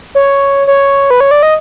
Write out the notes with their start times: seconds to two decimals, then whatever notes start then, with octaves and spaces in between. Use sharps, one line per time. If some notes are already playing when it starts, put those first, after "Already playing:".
0.15 C#5
0.67 C#5
1.11 B4
1.20 C#5
1.31 D5
1.43 D#5